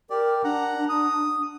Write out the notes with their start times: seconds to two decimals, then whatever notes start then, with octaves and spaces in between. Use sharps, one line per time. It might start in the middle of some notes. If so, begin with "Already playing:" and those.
0.10 G4 A#4 D5
0.44 D4 F#5 A#5
0.89 D#6